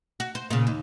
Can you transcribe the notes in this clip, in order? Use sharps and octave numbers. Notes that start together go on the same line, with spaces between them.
F#4
C5
A#2 C#3
D#2